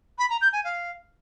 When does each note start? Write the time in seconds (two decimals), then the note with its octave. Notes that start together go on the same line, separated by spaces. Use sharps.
0.18 B5
0.30 A#5
0.41 G6
0.53 G#5
0.64 F5